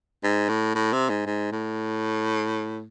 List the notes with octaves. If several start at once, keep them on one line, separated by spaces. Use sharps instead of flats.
G#2
A2
A2
C3
G#2
G#2
A2